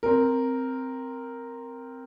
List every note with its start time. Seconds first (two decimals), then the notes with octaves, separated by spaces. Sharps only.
0.03 C4 A#4